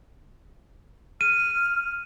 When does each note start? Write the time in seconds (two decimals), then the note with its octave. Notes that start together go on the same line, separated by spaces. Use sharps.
1.21 F6 D#7